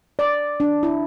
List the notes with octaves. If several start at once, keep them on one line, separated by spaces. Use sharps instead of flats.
D5
D4
E4